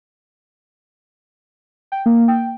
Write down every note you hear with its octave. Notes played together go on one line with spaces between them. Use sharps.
G5
A#3
G5